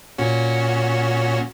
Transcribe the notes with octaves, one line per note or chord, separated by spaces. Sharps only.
A#2 C#4 F#4